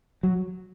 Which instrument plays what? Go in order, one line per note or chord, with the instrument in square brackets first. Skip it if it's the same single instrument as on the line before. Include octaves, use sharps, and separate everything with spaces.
[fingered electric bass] F#3